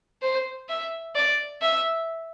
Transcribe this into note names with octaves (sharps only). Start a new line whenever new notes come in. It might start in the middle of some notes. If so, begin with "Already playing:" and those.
C5
E5
D5
E5